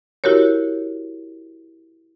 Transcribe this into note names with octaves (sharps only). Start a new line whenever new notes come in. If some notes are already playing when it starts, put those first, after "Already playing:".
E4 F#4 G4 A#4 C#5